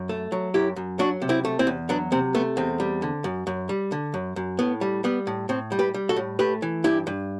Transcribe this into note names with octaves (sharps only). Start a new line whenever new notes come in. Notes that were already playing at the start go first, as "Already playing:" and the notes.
Already playing: F#2
A3
F#3
F#2 E4 G4
F#2
F#3 D4 F#4
C3
C4 E4
A3
C4 E4
E2
F#3 B3 D4
C3 C4
A3 B3
E2 C4
G3
D3
F#2
F#2
G3
D3
F#2
F#2
A2 B3
G3
G3 B3
A2
A2 C4
G3
G4 B4
G3
F#4 A4
A2
A3 G4 B4
E3
G2 E4 G4
G2